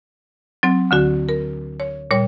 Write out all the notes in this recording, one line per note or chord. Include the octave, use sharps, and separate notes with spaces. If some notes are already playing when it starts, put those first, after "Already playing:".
F#3 C4
D2 D3 F#4
A#4
C#5
A#2 G3 C#5